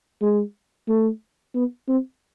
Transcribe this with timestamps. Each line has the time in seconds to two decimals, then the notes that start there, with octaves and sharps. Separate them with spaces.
0.22 G#3
0.88 A3
1.55 B3
1.88 C4